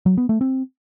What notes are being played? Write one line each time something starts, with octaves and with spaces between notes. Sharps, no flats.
F#3
B3
A3
C4